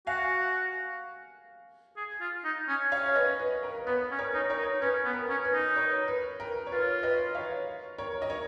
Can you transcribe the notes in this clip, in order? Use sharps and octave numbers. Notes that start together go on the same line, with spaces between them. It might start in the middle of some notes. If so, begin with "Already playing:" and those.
F#4 F5 G#5
G#4
F4
D#4
C#4
C#4 C#5 F5
B4 D#5
B4
A#4
B3 B4
C#4
A#4 C#5
D#4
A#4 C#5
D#4
C#4 B4
B3
A#4
C#4
B4
D#4
A#4 C#5
B4
A#4
C#5
F4 B4
B4 D#5
C#5 F5
A#4 C#5
D#5
A#4 C#5